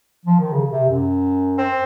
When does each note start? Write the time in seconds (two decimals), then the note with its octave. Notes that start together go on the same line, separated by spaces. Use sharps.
0.26 F3
0.40 D#3
0.53 C#3
0.71 C3
0.89 F#2
1.58 C4